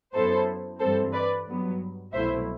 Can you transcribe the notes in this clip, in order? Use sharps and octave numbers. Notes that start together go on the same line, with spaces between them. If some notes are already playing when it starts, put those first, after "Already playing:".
F#2 F#3 B3 E4 A4 C5
G2 E3 G3 C4 A4 C5
B4 D5
G2 F#3 B3
C2 B2 F#3 A3 E4 C5 E5